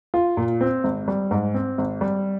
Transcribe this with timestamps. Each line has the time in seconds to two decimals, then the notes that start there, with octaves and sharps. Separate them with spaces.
0.14 F4
0.37 A#2
0.61 C4
0.84 G#1
1.08 G3
1.31 G#2
1.54 C4
1.78 G#1
2.01 G3